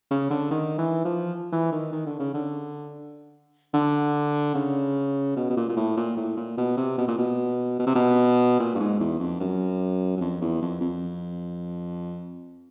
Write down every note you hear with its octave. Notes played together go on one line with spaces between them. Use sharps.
C#3
D3
D#3
E3
F3
E3
D#3
D#3
D3
C#3
D3
D3
C#3
B2
B2
A#2
A#2
A2
A#2
A2
A#2
B2
C3
B2
A#2
B2
B2
C3
B2
A#2
G2
G#2
E2
F2
F#2
F#2
F2
E2
F2
F2